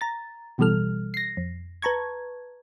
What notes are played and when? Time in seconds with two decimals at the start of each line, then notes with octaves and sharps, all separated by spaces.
0.01 A#5 A6
0.58 A1 B2 E3 G3 A4 F6
1.14 A#6 C7
1.37 F2
1.82 B4 A5 A#5 C#6 G#6